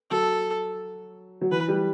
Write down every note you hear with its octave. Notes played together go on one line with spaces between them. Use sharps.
F#3 A4
F#3
E3 B4
G3